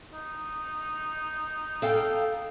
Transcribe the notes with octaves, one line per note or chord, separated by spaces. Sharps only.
D#4
A4 F5 G5